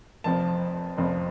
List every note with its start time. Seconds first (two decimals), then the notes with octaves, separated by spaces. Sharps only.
0.24 F1 F2 F3 A5
0.98 F1 F2 F3